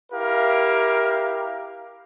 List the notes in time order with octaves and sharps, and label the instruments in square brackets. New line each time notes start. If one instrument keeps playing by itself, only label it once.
[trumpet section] E4 G4 A#4 F5